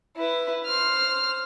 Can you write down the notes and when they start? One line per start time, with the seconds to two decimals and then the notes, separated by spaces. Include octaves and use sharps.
0.17 E4 B4
0.66 C5 F6